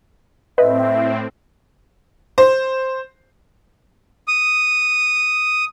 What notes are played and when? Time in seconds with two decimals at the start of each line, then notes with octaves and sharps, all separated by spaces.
0.58 A2 C4 B4 D#5 E5
2.38 C5
4.28 D#6